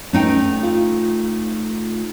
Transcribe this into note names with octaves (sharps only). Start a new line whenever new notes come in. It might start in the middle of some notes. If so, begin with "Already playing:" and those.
A3 C#4 D#4 G5
F4